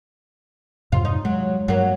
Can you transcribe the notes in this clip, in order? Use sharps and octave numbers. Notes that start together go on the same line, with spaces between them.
F2 G#2 C3 F4
D#4
F#3 G#3
G2 F#3 A#3